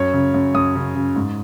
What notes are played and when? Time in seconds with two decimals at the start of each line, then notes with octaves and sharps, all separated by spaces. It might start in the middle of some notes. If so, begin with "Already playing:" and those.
Already playing: F#2 C#5
0.13 C#3
0.34 F#2
0.55 F#2 D#6
0.75 C#3
0.95 C#3
1.16 G#2